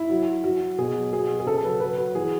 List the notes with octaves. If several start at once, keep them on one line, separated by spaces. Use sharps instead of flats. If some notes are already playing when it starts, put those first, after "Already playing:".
Already playing: E4
F#3
F#3
F#3 F#4
F#3
B2 G#4
F#3
B2 G#4
F#3
G#4
C#3 A4
F#3 B4
F#3 B4
F#3
E3 G#4